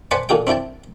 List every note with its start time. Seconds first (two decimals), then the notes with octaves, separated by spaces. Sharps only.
0.11 B4 C5 D5 F#5 G#5 A5
0.29 A#2 D3 G#4 G5
0.47 C4 D4 E4 G5 A5